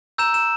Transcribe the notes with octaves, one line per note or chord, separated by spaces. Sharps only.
A#5 E6 G6 E7
E7